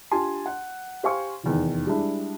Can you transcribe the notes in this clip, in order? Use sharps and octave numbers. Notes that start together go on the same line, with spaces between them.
D4 F4 G4 G#5 A5 C6
F#5
G4 C5 F5 G#5 C#6
F1 E2 D#3
G3 G#3 D4 E4